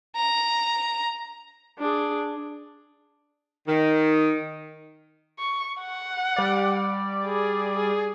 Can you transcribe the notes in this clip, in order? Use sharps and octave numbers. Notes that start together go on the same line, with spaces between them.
A#5
D4 G#4
D#3
C#6
F#5
G3 D5
G#4
G#4